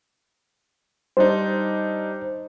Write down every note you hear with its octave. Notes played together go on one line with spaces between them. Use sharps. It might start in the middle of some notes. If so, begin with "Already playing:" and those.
G3 D4 D#4 C5